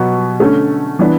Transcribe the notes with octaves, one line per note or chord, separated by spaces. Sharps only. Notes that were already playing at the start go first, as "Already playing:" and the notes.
Already playing: B2 F#3 B3 F#4
D3 A3 C#4
E3 B3 D4